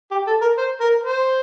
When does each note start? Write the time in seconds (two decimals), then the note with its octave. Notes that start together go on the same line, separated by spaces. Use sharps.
0.11 G4
0.27 A4
0.42 A#4
0.58 C5
0.81 A#4
1.04 C5